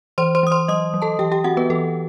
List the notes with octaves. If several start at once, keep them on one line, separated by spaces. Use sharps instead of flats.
E3 C5 C6
C5 C6
E3 D#6
C5 C6
F#3 D#5 D#6
F#3
A4 A5
E3 G4 G5
G4 G5
C4 F#4 F#5
B3 B4
E3 A4